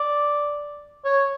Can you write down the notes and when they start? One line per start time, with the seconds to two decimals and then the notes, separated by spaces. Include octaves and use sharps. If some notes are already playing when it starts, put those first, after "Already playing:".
Already playing: D5
1.05 C#5